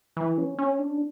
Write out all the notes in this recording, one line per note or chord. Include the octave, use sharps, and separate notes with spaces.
E3
C#4
C#4
D4